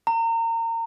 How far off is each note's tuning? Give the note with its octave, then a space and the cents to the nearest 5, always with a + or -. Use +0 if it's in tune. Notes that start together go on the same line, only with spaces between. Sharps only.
A#5 -30